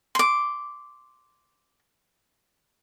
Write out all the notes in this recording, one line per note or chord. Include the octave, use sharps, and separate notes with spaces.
C6 D6